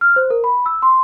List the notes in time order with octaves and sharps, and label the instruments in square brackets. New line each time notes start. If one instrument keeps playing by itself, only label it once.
[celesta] F6
C5
A#4
B5
E6
C6